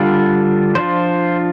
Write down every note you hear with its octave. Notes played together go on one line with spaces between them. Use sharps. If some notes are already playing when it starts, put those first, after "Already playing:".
Already playing: D3 G3 D4 F4
F3 D4 F4 C5